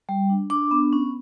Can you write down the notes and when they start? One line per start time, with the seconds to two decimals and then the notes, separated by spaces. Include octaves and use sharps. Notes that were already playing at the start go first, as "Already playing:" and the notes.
0.09 G3
0.30 D4
0.50 D4 D6
0.71 B3
0.93 C#4